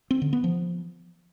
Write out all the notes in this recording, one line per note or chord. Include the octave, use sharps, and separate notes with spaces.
C4
D3
B3
F3